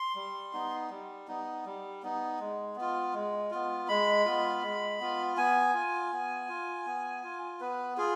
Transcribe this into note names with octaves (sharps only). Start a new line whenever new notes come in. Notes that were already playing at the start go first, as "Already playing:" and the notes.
Already playing: C6
G3
B3 D#4
G3
B3 D#4
G3
B3 D#4
G#3
B3 F4
G#3
B3 F4
G#3 B5
B3 F4
G#3
B3 F4
B3 G#5
F4
B3
F4
B3
F4
B3 B4
F4 G#4